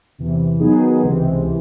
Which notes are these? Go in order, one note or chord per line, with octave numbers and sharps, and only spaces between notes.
E2 C3 E3
D#3 F#3 B3 D#4 G#4
C#2 C3 E3 G#3 C4
C3 E3